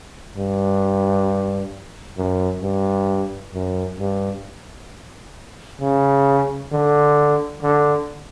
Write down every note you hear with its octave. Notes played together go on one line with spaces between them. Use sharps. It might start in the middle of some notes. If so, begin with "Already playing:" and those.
G2
F#2
G2
F#2
G2
C#3
D3
D3